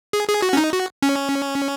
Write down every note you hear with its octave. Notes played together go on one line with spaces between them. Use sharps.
G#4
G#4
F#4
C#4
D#4
F#4
C#4